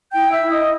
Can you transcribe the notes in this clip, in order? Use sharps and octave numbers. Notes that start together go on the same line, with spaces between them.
E4 G5 G6
E5 E6
E4
D#5 D#6